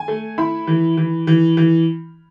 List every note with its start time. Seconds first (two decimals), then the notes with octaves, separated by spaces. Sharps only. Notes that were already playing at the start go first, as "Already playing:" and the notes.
Already playing: G#5
0.08 A3
0.38 E4 B5
0.67 E3
0.97 E3
1.27 E3
1.57 E3